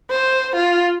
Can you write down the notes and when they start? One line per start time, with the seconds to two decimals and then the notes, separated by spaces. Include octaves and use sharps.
0.11 C5
0.56 F4